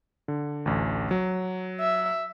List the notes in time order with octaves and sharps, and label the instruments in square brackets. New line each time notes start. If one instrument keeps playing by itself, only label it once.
[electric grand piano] D3
A1 D2
F#3
[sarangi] E5